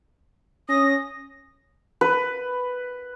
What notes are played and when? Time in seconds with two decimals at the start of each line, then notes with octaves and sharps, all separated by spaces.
0.69 C#4 D#6 A#6
2.01 B4